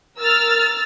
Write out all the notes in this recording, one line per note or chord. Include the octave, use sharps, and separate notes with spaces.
A#4 E6 F6 A6